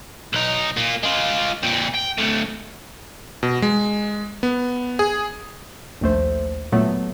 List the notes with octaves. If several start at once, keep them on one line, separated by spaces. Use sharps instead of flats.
B1 D#4
A#3 F4
G#3 F4
A#2 C4
G5
D2 A2
B2
G#3
B3
G#4
A#1 D#2 A3 C5
A#2 F#3 A3 B3